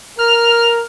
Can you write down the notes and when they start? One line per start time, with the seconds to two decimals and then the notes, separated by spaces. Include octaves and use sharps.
0.19 A#4 F6